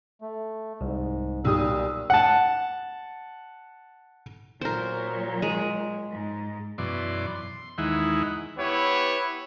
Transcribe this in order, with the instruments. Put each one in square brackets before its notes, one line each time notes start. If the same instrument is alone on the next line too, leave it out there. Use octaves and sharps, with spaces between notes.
[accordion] A3
[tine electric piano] C2 [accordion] G#2
[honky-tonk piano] B1 G4 D#6 [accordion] A#2 G3 E6
[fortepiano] F#5 A5
[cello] A#2 F#3 [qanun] A#4 C5
[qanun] G#3
[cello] G#2
[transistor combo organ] F#2 B2 E3 D5 C6
C6
D#2 E3 G#3 D#4 E4 F#5
[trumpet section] B3 E4 G4 B4 C#5